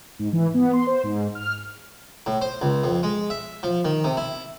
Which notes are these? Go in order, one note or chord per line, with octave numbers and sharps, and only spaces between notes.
G#2
E3
B3
C6
C5
G#2
F6
A2
C5
C#2
F2
G#3
E5
F3
D#3
C3
E4